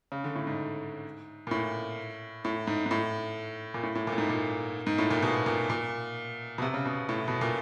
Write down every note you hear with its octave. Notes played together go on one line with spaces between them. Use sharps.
C#3
D3
A2
G#2
A#2
A2
A2
G#2
G#2
A2
A#2
A2
A2
A#2
A2
G#2
A#2
G#2
A2
A#2
B2
A#2
A#2
B2
C3
C#3
B2
A2
B2
A#2